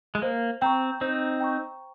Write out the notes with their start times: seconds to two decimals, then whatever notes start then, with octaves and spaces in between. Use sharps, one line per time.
0.15 G#3
0.22 A#3 C5
0.62 C4 G5 A#5 C#6
1.01 C4 D#4 C5
1.40 G5 A#5 C#6